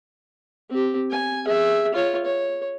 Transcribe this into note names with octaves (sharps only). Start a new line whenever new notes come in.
C4 G4
G#5
G#4 E5
F4 C#5
C#5